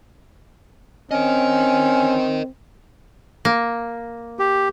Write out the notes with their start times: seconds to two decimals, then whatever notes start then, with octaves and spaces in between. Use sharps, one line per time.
1.11 C4 C#4 A#4 D#5
3.45 A#3
4.39 G4